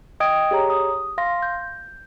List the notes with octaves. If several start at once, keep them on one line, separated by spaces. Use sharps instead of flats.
D#5 G5 D#6 G#6 D7
G4 G#4 C#5 A#5
D#6
F5 C6 A#6
G6